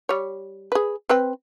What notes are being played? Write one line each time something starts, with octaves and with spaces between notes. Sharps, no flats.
G3 C#5
G#4 B4
C4 B4 G5